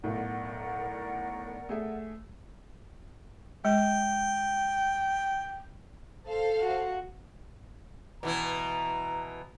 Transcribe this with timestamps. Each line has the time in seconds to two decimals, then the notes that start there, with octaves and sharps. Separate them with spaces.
0.04 B1 A2 A#4 D5 F#5
1.69 A3 G#4 E5
3.65 G#3 G5
6.26 A4 C5 F5
6.61 F#4
8.23 B2 E3 E4 A#5